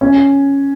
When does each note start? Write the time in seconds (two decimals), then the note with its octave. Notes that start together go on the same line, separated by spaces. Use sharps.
0.01 C#4